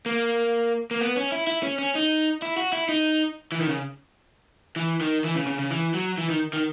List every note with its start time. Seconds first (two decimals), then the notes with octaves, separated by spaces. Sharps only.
0.06 A#3
0.91 A#3
1.01 B3
1.17 C#4
1.32 E4
1.47 E4
1.63 C#4
1.79 C#4
1.95 D#4
2.42 E4
2.57 F#4
2.72 E4
2.89 D#4
3.52 E3
3.61 D#3
3.66 C#3
4.76 E3
5.01 D#3
5.24 E3
5.35 C#3
5.47 C#3
5.59 C#3
5.71 E3
5.94 F#3
6.18 E3
6.29 D#3
6.53 D#3